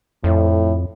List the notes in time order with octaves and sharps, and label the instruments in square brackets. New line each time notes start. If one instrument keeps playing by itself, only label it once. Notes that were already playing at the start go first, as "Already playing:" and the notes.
[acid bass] F2 [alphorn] A2